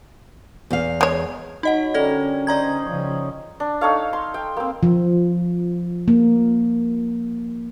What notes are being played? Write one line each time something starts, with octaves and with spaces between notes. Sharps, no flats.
E2 F5
G#3 C#5
F#3 D#4 D#5 F#5
D3 G3 C#4 A4 A#4 D5 G#6
D#4 C5 D5 D#5 A#5 G#6
C#3 F3 C#5
D4
D#4 A4 C#5 F5
C6
G5
A#3 C4
F3
A#3